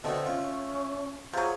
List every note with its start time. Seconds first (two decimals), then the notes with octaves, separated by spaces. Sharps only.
0.04 B2 D3 A3 C4 D#5
0.26 C#4 F4
1.33 C3 F#3 F4 G#4 G#5